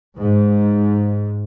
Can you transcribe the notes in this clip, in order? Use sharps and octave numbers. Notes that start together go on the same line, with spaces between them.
G#2